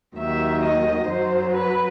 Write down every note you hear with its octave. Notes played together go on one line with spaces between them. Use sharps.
D#2 D#3 F#3 E5
D#5
F#2 F#3 C5
B4